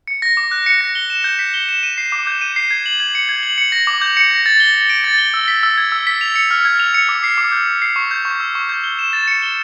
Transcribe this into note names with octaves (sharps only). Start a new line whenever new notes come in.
C#7
A#6
D6
F#6
C#7
A#6
G7
E7
G6
B6
G7
E7
D#7
C7
D6
G6
D#7
C7
G#6
F#7
G#6
C#7
G#6
F#7
C#7
A#6
D6
G6
C#7
A#6
A6
G7
A6
D7
A6
G7
E6
B6
E6
G#6
E6
B6
F7
C#7
F6
G#6
F7
C#7
D6
C7
D6
G6
D6
C7
C#6
G6
C#6
E6
C#6
G6
G7
E7
A6
C#7
G7